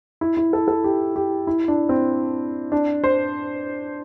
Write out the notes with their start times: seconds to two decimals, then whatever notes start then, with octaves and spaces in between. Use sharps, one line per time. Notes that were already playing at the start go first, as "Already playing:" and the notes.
0.21 E4
0.37 E4
0.53 A4
0.68 A4
0.84 G4
1.16 G4
1.47 E4
1.68 D4
1.89 C4
2.72 D4
3.04 C5